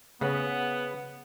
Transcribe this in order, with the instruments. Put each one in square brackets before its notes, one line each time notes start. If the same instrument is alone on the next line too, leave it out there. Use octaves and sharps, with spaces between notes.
[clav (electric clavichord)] C#3 [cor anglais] B3 [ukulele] C#4 B4 F#5